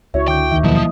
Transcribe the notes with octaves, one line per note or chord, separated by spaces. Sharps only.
C#2 E4 F#4 C#5 E5
D3 G5 C#6 D6 G6
D#2 E5
C#2 B2 F3 F#3 A#3 E4 D#5
D#6